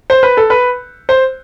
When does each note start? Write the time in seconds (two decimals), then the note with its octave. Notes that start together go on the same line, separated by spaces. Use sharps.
0.10 C5
0.23 B4
0.37 A4
0.50 B4
1.09 C5